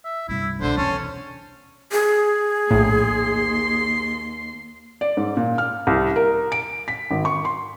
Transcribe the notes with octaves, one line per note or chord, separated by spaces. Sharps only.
E5
C2 G2 E4
B1 B2 D3 C5
E2 C3 C#4 A5
G#4
A#1 D#2 A2 C6
D5
G#2
A#2
F6
C2
A#4
D7
B6
G#1
C#6
C6